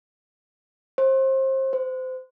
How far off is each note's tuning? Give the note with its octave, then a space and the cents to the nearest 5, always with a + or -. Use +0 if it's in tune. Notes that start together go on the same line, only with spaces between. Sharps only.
C5 +30
C5 -25